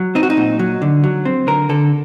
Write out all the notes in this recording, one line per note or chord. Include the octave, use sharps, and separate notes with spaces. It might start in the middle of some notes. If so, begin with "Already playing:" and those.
Already playing: F#3
C4 D#4
F#4
D#4
A#2
F#3
D3
F#3
C4
D3 A#4
D3 A4